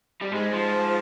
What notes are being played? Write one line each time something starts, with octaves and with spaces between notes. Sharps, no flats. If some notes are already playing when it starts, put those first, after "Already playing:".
G3
G#2 G#3
F3